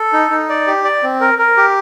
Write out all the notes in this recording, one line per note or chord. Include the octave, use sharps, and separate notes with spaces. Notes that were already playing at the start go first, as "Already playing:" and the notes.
Already playing: A4
D#4
D#4
D5
G4
D5
C4
A#4
A#4
G4